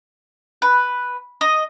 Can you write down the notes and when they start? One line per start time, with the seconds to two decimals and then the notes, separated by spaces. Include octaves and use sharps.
0.62 B4
1.41 D#5